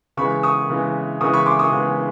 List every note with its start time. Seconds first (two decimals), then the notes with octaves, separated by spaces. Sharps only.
0.17 C#3 E3 G#3 B5 C#6
0.43 C#6 D#6
0.70 C#3 E3 G#3
1.21 C#3 E3 G#3 C#6 D#6
1.33 B5 C#6
1.46 C6 D6
1.59 C#6 D#6
1.72 C#3 E3 G#3